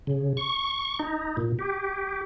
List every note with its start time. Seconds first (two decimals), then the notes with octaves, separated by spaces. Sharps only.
0.07 C#3
0.37 C#6
0.99 D#4
1.37 A#2
1.59 G4